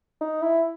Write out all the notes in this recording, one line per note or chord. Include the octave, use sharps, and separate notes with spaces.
D#4
E4